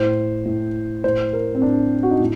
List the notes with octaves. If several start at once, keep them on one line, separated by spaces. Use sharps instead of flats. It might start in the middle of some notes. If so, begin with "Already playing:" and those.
Already playing: A2 C5
A2
A2 C5
A#4
C4
A2 D4
F#4
D#4
A2